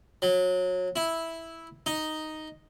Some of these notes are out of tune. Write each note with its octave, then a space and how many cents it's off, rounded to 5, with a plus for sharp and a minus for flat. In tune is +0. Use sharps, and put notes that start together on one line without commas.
F#3 -25
E4 -5
D#4 +0